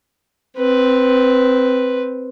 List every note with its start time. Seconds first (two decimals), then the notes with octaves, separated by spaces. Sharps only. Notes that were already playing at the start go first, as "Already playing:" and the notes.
0.57 C4 B4